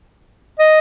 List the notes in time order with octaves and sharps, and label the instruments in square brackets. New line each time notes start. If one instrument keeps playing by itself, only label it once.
[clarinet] D#5